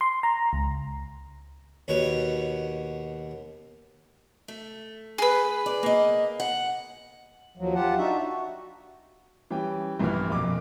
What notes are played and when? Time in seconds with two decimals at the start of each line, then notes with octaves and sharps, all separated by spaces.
0.01 C6
0.23 A#5
0.53 C#2
1.88 D#2 B2 C#5
4.48 A3
5.18 G#4 B4
5.66 D5
5.83 A#3 D#5
6.40 F#5
7.58 D#2 F3 F#3
7.75 F4 G4 F#5 A5
7.98 D4 D#4 F#4 E5
8.18 F#4
9.51 E3 G3 C#4 G5
10.00 A#1 G2 E3 A#3 B3 F6
10.30 B1 F2 A#3 D6